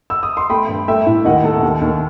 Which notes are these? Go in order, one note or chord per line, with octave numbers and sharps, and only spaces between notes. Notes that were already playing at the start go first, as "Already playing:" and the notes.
E6
D#6
C6
A3 G5 B5
G2
A3 E5 G5
A2
D#2 D#5 F#5
A3 A4
D#2
D#2